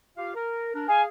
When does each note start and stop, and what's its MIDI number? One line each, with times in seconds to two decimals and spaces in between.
0.17 0.34 65
0.17 0.34 67
0.17 0.34 77
0.35 0.73 70
0.74 0.85 62
0.74 0.85 70
0.88 1.07 68
0.88 1.07 77
0.88 1.02 80